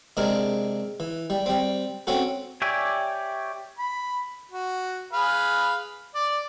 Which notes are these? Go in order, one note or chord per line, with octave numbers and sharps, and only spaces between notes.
C3 G#3 D4 A#4
E3
G3
G3 C4
C4 C#4 F#4 A4
G4 C#5 D5 E5 G#5
B5
F#4
G#4 B4 F5
D5